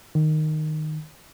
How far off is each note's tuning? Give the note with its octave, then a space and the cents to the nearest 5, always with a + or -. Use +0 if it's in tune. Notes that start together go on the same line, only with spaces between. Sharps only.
D#3 -10